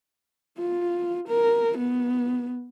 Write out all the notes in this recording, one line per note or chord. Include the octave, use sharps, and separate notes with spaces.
F4
A#4
B3